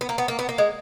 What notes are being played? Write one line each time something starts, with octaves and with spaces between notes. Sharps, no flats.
B3
A#3
B3
A#3
B3
A#3
G#3